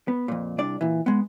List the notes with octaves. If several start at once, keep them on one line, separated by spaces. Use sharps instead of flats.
B3
F2 A#2
C2 D4 D5
A#2 E3
G#3 B3